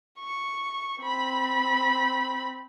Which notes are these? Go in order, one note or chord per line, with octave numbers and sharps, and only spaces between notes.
C#6
C4 B5